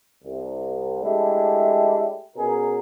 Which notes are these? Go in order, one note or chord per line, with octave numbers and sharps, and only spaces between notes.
C2
G#3 A3 D4 E4 G4
B2 C#4 G#4 A#4